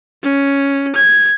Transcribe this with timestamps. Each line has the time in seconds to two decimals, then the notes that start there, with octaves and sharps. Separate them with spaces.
0.23 C#4
0.96 G#6